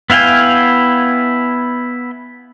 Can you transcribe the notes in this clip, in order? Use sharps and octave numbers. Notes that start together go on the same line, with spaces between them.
B3 E4 F5 G5 G#5